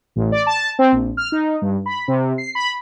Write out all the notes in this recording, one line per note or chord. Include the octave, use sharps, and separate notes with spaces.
A1
D5
A5
C4
A#1
F6
D#4
G2
B5
C3
C7
B5